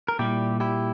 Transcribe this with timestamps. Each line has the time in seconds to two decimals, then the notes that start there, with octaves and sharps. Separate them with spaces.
0.08 A#4
0.19 A#2 G3 E4 G4
0.60 E4 G4